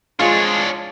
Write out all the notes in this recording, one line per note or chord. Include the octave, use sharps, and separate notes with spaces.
F3 G#3 D4 F4 C#5